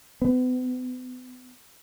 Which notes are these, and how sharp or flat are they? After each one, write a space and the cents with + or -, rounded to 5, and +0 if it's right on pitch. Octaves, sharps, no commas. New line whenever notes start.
B3 +40